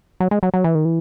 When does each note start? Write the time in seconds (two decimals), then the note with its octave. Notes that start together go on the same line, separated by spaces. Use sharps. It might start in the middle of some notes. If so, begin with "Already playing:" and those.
0.20 F#3
0.31 G#3
0.43 F#3
0.54 F#3
0.64 E3
0.75 D#3
0.85 E3